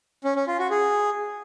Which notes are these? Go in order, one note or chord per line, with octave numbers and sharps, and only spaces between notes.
C#4
C#4
F4
F#4
G#4